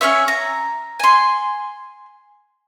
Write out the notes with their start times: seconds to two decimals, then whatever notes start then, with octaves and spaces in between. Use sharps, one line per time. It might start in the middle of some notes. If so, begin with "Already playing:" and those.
0.01 C#4 G#4 C#5 E5
0.28 A#5
1.00 G#5 C6